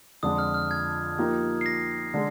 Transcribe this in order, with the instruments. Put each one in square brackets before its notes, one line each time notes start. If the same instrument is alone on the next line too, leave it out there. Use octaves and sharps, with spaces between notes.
[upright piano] F2 D3 G#3 D4 [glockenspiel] D#6
[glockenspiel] F6
F6
G#6
[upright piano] F3 A#3 D#4 G4
[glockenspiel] C7
A#6
[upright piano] D3 G#3 D4